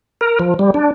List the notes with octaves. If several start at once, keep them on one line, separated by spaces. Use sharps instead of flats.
A#4
F3
G3
D4